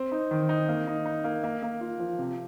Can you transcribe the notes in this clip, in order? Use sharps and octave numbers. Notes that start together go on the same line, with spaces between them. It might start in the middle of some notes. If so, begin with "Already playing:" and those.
Already playing: C4
D#4
D#3
D#4
A#3
D#4
D#4
A#3
A#3
A#3
F4
F3
C3